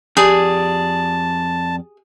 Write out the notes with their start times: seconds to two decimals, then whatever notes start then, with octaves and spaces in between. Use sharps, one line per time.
0.17 F2 G4 G#4 D5 A5